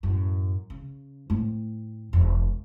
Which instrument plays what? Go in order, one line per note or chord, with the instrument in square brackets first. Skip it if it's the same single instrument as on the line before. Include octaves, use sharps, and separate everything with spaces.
[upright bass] F#2 A2
C#3
A2 C4
E1